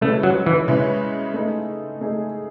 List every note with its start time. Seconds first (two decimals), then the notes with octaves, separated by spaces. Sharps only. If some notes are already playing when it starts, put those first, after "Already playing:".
0.01 C#3 G#3 A3 C#4 E4 B4
0.23 F#3
0.46 E3
0.68 C#3 G#3 C#4 E4 B4
1.34 A3 D#4 G#4
2.01 A3 D#4 G#4